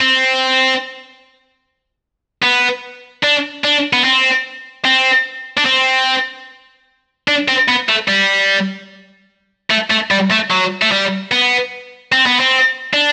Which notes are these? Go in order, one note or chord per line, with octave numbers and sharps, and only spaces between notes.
C4
B3
D4
D4
B3
C4
C4
D4
C4
D4
C4
B3
A3
G3
A3
A3
G3
A3
F#3
A3
G3
B3
C4
B3
C4
D4